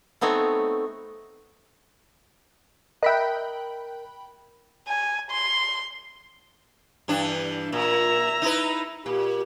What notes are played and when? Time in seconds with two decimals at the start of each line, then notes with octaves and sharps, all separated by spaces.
0.21 A3 B3 C4 D#4 C#5
3.03 A#4 D#5 E5 G5 B5 F#6
4.88 G#5
5.31 C6
7.08 G2 E3 D4
7.72 A#2 E5 A#5
8.42 D#4 E4 B4
9.06 A#2 G4